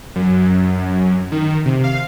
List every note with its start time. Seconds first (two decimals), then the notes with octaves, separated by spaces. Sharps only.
0.16 F#2
1.32 D#3
1.66 C3
1.84 F5